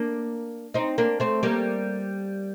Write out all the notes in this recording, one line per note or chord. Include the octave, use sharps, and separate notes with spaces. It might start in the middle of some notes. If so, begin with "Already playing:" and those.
Already playing: A#3 D4
C4 D#4
A#3 D4
A3 C4
G3 A#3